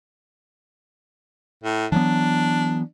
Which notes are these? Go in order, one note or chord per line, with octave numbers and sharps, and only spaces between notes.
A2
E3 F#3 B3 D4